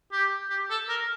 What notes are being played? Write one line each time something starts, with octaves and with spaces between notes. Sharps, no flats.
G4
G4
A4
A#4